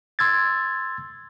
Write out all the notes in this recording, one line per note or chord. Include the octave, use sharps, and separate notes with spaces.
C6 E6 G#6 A6